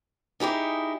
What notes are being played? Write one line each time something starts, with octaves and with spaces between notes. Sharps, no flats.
D#4 E4 G4 G#4